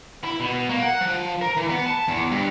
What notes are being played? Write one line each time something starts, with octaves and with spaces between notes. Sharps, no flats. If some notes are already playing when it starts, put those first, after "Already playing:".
E4
B2
A#3
F#5
F3
A#4
E3
B3
A5
E2
G2